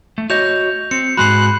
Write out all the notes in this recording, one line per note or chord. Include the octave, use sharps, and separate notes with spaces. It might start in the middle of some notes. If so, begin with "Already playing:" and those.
A3
F#4 C#5 D#5 G6 F7
C4 C#7
G#2 G#3 F#4 B5 C6 F#6 C7